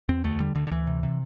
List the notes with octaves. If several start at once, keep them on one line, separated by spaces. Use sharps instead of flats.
E2 C4
D2 A3
D3 G3
D2 D3
D3
D2 E3
C3
C3